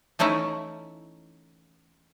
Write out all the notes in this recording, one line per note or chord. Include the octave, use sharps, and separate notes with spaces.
E3 A3 C#4 D#4 E4